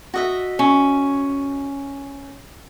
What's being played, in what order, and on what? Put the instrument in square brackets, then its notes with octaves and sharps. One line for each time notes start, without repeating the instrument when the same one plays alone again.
[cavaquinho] F#4 D#5 E5
[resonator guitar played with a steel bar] C#4